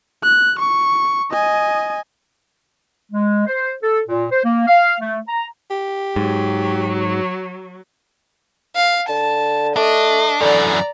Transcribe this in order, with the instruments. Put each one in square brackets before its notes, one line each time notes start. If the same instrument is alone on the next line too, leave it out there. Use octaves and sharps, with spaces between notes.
[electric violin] F#6
C#6
D#5 G#5
[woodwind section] G#3
C5
A4
A#2
C5
A#3
F5
A3
A#5
[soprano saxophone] G4
[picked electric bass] G#2 [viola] F#3
[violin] F5
[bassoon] D3 [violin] A5
[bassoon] A3 [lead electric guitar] D4 [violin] D#5
[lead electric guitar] F#2 E3 [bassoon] D3 [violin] D5 A#5